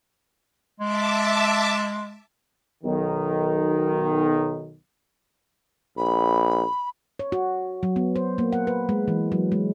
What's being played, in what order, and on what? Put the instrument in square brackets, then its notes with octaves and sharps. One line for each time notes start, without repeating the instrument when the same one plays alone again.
[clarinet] G#3 [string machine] E5 A5 D6
[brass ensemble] B1 D#3
[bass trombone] A#1 [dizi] B5
[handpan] C#5
F#4
F#3
B3
C5
A#3
F#5
B4
G#3
E3
F#3
G#3